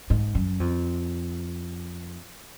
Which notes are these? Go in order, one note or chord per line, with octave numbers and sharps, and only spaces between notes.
G#2
F#2
F2